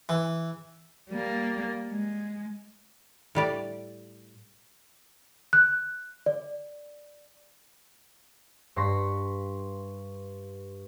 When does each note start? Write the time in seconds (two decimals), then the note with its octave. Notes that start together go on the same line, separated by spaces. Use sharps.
0.09 E3
1.10 G3 A#3
1.90 G#3
3.35 A2 G3 D5
5.53 F#6
6.26 D5
8.76 G2 C6 C#6 A#6 B6